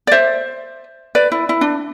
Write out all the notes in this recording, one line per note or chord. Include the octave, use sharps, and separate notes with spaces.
D5
C5 E5
B4 D5
E4
E4
D4